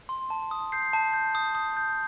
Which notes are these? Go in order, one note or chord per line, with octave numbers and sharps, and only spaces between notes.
C6
A5
D#6
G6 C7
A5
G6
D#6
D#6
G6